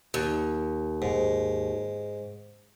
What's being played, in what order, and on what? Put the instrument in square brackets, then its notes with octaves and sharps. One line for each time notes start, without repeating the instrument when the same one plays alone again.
[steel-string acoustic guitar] D#2
[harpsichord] G#2